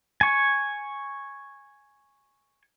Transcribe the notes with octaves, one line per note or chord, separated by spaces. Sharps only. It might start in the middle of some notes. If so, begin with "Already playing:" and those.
G#5 C#6